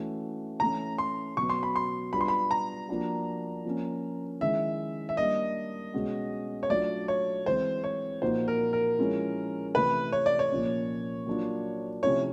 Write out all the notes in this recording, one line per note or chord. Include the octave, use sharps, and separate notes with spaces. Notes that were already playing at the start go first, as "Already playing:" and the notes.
Already playing: E3 A3 C#4 F#4
E3 A3 C#4 A#5
C6
B2 F#3 B3 C#6
C6
B5
C6
G3 B3 D4 F4 B5
C6
B5
A#5
F3 A#3 D4 F#4
F3 A#3 C#4
D#3 G#3 C#4 E4 E5
E5
G3 A#3 D4 D#5
B2 G#3 C#4 F#4
C#5
F#3 A3 D4 F4 D5
C#5
E3 G#3 C4 C5
C#5
A#2 F3 A#3 D#4 F#4 C5
A#4
A#4
F3 G#3 C#4 E4
C3 E3 A3 B4
C#5
D5
C#5
A#2 F3 A#3 C#4
F#3 A#3 D4 F4
C3 F3 A3 C#4 E4 C#5